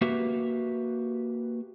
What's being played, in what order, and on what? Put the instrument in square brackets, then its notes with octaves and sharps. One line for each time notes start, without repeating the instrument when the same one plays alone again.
[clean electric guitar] A#3 F#4 G4 B4 E5